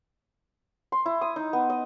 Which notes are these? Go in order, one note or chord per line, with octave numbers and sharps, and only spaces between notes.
C6
E4
D#6
D#4
B3
D#5